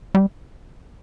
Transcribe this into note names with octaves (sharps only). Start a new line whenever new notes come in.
G3